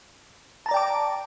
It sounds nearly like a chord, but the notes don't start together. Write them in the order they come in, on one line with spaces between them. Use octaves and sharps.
A5 A#5 D5 G5 D6